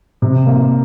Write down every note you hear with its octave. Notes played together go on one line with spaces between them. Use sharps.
C3
A#3